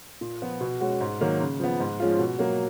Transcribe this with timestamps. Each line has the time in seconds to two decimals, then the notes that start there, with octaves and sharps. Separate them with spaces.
0.21 A#2
0.42 F3 B3
0.61 B2
0.81 G#3 C#4 F#4
1.01 G#2
1.21 D#3 F#3 A#3
1.40 C#3
1.60 F3 B3
1.80 G#2
2.00 F3 G#3 C#4 F4
2.19 B2
2.39 F#3 A#3